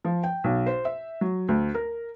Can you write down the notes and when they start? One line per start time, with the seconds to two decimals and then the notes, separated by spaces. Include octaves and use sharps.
0.05 F3
0.23 G5
0.44 B1
0.66 C5
0.85 E5
1.21 F#3
1.48 D2
1.74 A#4